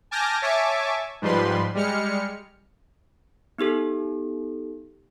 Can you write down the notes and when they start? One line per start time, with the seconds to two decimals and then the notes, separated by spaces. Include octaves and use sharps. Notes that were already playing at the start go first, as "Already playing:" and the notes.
0.11 G#5 A5 D6 F6 G6 A#6
0.42 C#5 E5 G#5 A5 C#6 D6
1.22 G#2 F3 G3 B4 C6
1.75 G3 G#3 F6 C#7
3.58 B3 D#4 G4 A4